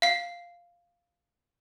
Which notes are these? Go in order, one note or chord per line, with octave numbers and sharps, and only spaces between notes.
F5 C7